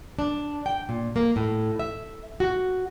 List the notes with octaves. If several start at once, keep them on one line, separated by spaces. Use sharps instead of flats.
D4
G5
A#2
A#3
A2
E5
F#4